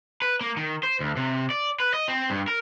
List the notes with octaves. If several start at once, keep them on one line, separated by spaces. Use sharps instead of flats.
B4
A#3
D#3
C5
D2
C3
D5
B4
D#5
C4
G2
A#4